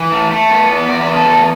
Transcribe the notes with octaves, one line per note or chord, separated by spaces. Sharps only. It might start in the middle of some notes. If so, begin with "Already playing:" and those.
Already playing: E3
A3
A3
B3
E2
E2 D5
B4
B3
A4
E2 A4